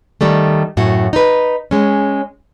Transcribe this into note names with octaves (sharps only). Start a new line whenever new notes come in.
D#3 G3 A3
F#2 A2 F#4
D#4 B4
G#3 C#4